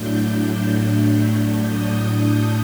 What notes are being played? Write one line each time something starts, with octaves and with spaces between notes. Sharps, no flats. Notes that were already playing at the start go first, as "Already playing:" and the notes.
Already playing: A2 F#3 A3 D4 G6
D#6